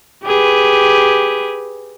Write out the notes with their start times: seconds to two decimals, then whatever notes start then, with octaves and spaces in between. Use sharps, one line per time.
0.24 G4 G#4 B4